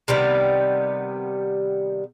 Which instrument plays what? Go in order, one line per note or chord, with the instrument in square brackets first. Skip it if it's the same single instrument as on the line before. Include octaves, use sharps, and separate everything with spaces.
[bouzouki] C3 D#3 G3 B3